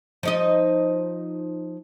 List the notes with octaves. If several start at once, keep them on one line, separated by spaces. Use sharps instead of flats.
F3 D#4 D#5